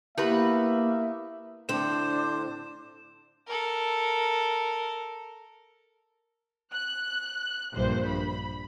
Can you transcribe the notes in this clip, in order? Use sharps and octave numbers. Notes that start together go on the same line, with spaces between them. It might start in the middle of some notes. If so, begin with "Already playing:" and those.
A#3 B3 E4 G4 B4 E5
A2 D3 C4 D4 C5 E7
A4 A#4
F#6
A#1 G2 C5
B5